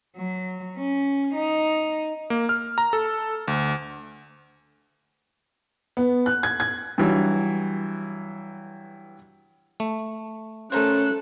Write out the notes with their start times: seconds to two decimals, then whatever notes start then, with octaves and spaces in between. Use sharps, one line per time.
0.17 F#3
0.77 C#4
1.35 D#4
2.30 A#3
2.49 F6
2.78 A#5
2.93 A4
3.48 D2
5.97 B3
6.26 F#6
6.43 G#6
6.60 G#6
6.98 G2 E3 F#3
9.80 A3
10.72 A3 C#4 A4 A#4 C5 F#6